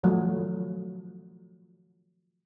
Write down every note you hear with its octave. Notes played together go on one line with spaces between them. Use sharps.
D#3 F3 F#3 A3